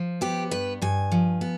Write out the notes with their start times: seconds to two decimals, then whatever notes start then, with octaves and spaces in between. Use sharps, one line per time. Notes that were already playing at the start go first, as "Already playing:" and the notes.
Already playing: F3
0.21 B3 G4
0.51 G2 B4
0.82 G2 G#5
1.12 F3
1.41 B3